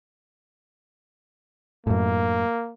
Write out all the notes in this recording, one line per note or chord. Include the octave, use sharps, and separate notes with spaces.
F#2 A2 A#3